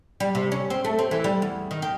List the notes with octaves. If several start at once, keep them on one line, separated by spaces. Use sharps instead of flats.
G3
C3
C#4
C4
A3
C4
E3
G3
E2
D#3
G4